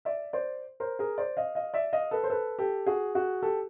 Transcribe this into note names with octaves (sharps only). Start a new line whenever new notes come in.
D5 E5
C5 D5
A#4 C5
G#4 A#4
C5 D5
D#5 F5
D#5 F5
D5 E5
D#5 F5
A4 B4
C5
A4 B4
G4 A4
F#4 G#4
F#4 G#4
G4 A4